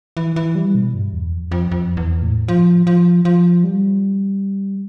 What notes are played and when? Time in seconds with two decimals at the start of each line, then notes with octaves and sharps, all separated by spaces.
0.17 E3
0.36 E3
0.55 G3
0.75 B2
0.94 G2
1.13 E2
1.33 F2
1.51 F2
1.71 F2
1.97 E2
2.22 A2
2.48 F3
2.87 F3
3.25 F3
3.64 G3